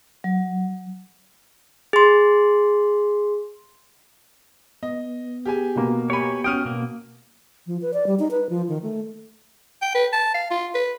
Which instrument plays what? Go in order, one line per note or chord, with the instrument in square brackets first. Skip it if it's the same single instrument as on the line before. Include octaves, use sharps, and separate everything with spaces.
[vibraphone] F#3
[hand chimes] G#4 C6
[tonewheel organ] B3 [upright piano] D#5
[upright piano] G4 G#4 G#5
[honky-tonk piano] B2 A#3
[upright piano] G4 B5 [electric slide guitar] C#5 G#5
[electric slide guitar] C#4 G5 [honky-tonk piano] F#4 [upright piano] D#6 F6 D#7
[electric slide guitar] B2 A#3
[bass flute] F3
B4
D5
G3
D#4
B4
F3
D#3
A3
[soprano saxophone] G5
B4
A5
F5
F4
B4